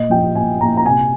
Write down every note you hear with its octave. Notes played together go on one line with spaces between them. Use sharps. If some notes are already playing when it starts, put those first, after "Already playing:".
Already playing: A#2 D#5
F3 G5
A#2 G#5
A#2 A#5
A#5
C3 G#5